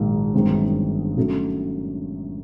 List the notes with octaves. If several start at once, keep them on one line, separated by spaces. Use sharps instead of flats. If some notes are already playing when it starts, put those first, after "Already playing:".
Already playing: A#1 G#2 D#3 F#3
G1 F#2 D#3 G#3 C4
D#3 F#3 A3 C#4